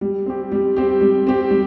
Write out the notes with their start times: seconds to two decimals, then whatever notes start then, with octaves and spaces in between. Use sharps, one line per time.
0.01 G3
0.26 C4 G4
0.52 G3
0.76 C4 G4
1.01 G3
1.27 C4 G4
1.50 G3